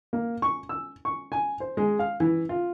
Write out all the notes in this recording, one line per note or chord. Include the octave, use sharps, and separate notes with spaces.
A#3
C#6
E6
C#6
G#5
C5
G#3
F5
E3
F4